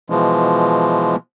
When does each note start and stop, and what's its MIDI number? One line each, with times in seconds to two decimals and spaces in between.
0.10 1.16 47
0.10 1.16 52
0.10 1.16 53
0.10 1.16 56